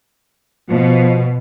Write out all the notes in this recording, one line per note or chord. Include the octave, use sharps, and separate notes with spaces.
B2 F3